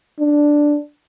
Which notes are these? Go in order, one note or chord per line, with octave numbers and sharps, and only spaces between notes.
D4